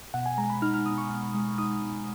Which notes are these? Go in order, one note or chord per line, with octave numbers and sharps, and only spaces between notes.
B2 F#5
G#5
G#3 A#5
B5
D#4 F6
F6
B2 D#6
C#6
B2
G#3
D#4 D#6
B2